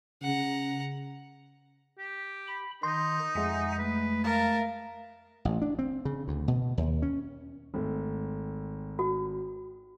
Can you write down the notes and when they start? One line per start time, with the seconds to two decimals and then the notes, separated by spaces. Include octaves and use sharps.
0.22 C#3 F#5 A#5
1.98 G4
2.48 B5
2.83 D#3 D#4 C6 G6 A#6
3.35 F2 G#3 E5 F#5 G#5
3.79 A3 B4
4.24 A#4 F5 A5
5.45 A1
5.62 D4
5.79 C4
6.05 C#3
6.28 D2
6.48 B2
6.78 D#2
7.02 C#4
7.74 G#1 A3
8.99 F#4